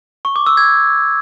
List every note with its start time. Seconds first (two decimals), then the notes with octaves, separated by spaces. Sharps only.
0.25 C#6
0.36 D6
0.46 E6
0.57 G#6